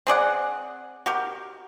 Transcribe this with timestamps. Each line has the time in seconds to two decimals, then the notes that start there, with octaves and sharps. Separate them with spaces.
0.07 C4 G#4 D5 F#5
1.06 F#4 G4 A#4